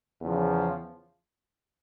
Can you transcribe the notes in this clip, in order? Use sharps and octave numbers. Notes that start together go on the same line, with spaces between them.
E2 C#3 F3